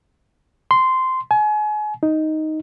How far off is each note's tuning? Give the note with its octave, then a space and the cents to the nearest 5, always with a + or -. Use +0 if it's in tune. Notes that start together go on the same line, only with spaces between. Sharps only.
C6 -10
G#5 +35
D#4 +5